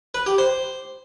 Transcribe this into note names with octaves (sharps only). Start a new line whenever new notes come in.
B4
G4
C5